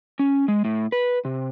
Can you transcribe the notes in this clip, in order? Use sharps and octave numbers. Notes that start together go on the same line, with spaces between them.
C#4
G#3
A2
B4
C3